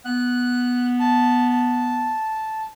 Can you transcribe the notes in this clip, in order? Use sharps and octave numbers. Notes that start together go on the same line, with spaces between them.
B3 F#6
A5
A5